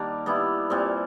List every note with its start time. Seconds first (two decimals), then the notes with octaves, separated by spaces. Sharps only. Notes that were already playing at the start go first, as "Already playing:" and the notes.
Already playing: D#3 G3 A#3 D4 G4
0.26 G3 B3 E4
0.70 A#2 G3 C4